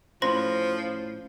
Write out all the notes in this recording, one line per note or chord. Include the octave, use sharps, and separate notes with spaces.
A2 F3 C#4 C5 B5 C6 A#6